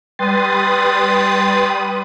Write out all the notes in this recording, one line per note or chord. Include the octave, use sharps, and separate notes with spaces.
G3 B4 G5 C6 D#6 A6